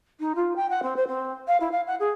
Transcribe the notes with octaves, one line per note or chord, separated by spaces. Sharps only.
D#4
F4
G5
F#5
C4
C5
C4
F5
E4
F5
F#5
G#4